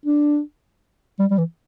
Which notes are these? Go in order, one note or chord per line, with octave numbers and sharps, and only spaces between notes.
D4
G3
G3
E3